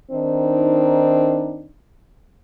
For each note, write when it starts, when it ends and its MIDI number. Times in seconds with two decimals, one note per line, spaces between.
0.12 1.69 51
0.12 1.69 60
0.12 1.69 62
0.12 1.69 63